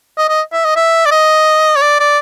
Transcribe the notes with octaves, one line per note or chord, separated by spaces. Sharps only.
D#5
D#5
E5
D#5
E5
D5
D#5
C#5
D5
D5